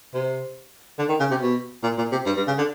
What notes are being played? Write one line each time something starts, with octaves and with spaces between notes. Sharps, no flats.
C3
D3
D#3
C#3
C3
B2
A#2
A#2
C3
G2
G2
C#3
D3